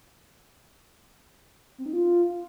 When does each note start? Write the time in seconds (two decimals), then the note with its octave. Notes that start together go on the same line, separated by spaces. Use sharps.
1.78 C4
1.86 D#4
1.93 F4